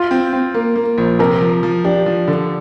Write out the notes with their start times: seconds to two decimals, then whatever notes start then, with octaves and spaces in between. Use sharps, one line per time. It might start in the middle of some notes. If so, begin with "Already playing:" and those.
Already playing: F4
0.11 C4
0.33 C4
0.54 A#3
0.76 A#3
0.98 A#1
1.19 C3 A#4
1.41 F3
1.63 F3
1.84 D4 G4
2.06 F3
2.28 D3